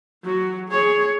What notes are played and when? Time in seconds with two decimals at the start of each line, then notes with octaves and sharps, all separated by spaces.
0.24 F#3 F#4
0.69 G#4 C#5